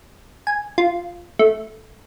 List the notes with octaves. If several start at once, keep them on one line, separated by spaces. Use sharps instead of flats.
G#5
F4
A3